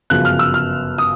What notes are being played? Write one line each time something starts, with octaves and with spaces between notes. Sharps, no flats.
G1 F#2 C#3 F3 F#6
F6
E6
F6
D#6